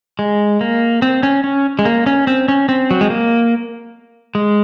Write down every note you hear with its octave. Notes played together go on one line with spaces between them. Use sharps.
G#3
A#3
C4
C#4
C#4
G#3
A#3
C#4
C4
C#4
C4
F#3
G#3
A#3
G#3